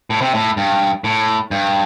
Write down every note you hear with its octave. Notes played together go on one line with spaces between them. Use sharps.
A2
C3
A2
G2
A2
G2